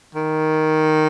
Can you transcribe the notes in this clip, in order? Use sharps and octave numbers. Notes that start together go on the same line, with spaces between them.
D#3